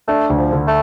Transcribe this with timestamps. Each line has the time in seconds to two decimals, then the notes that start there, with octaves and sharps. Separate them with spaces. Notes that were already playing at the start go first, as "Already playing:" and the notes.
0.08 A3 D4
0.30 D2
0.37 F3
0.52 D3
0.67 A3